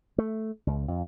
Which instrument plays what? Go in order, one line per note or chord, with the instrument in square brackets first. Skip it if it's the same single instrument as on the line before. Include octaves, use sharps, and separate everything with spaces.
[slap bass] A3
C#2
F2